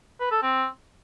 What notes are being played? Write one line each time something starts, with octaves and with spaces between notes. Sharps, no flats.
B4
A4
C4